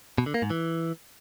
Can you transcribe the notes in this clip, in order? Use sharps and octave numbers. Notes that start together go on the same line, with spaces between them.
B2
D3
A#3
G#2
E3